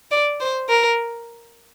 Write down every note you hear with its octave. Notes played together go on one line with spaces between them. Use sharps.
D5
C5
A#4